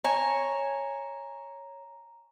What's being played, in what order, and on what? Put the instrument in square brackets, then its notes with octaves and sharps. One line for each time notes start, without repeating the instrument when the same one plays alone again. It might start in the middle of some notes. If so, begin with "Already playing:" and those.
[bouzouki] C#5 G#5 [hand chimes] A#5